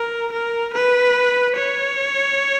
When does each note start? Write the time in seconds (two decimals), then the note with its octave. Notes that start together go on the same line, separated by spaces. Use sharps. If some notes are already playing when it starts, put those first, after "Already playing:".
Already playing: A#4
0.32 A#4
0.74 B4
1.56 C#5